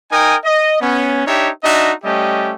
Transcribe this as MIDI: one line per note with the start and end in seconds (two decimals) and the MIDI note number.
0.11 0.36 63
0.11 0.36 70
0.11 0.36 79
0.11 0.36 80
0.11 0.36 87
0.44 0.80 75
0.81 1.25 59
0.81 1.25 61
1.26 1.50 62
1.26 1.50 63
1.26 1.50 67
1.26 1.50 73
1.26 1.50 76
1.63 1.92 62
1.63 1.92 63
1.63 1.92 66
1.63 1.92 75
1.63 1.92 76
2.04 2.54 55
2.04 2.54 57
2.04 2.54 61
2.04 2.54 67
2.04 2.54 75